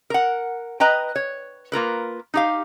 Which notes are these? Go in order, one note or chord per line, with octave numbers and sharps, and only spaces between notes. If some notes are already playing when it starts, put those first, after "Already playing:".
A#4 F#5
B4 D#5 G5 A#5
C#5
A#3 F4 A#4 B4
D#4 G4 F5